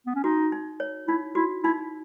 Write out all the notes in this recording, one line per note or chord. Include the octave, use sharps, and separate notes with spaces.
B3
C#4
D#4 F#4
D#4
C#5
D#4 E4
E4 F#4
D#4 E4